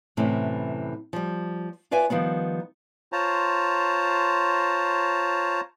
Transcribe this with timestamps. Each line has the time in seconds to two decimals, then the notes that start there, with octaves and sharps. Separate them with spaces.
0.17 F#2 A2 C3 E3
1.13 F3 G3
1.91 F4 B4 D5 E5 G#5
2.10 D#3 F3 G3 B3
3.12 F4 C5 C#5 A5 A#5